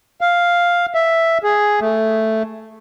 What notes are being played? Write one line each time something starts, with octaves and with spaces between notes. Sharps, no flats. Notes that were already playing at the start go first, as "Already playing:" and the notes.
F5
E5
G#4
A3